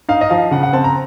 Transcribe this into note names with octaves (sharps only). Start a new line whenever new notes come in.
D#4 F5
D#5
F3 F5
C#3 F#5
F#5
C4 A5
A#5